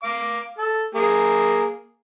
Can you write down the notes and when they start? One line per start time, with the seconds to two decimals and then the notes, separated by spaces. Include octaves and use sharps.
0.03 F5 D6
0.58 A4
0.95 A#3 G#4